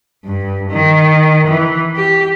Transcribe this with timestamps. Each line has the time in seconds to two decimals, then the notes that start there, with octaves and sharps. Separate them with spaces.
0.25 G2
0.70 D#3
1.47 E3
1.96 G4